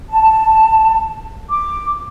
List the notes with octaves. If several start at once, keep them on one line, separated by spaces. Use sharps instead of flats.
A5
D6